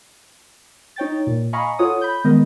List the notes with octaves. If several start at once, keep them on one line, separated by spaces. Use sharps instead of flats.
D#4 C#5 G5 A6
A#2
D#5 F5 G#5 A#5 B5 C#6
F4 A4 C#5 F#5 D#6
B5 G6
D#3 G#3 B3 A#4 D#5